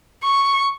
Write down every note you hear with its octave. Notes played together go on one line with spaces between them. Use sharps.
C#6